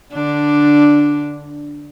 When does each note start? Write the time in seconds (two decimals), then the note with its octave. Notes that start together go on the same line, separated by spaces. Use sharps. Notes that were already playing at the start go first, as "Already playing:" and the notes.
0.13 D3 D4